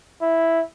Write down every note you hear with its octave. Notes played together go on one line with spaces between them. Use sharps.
E4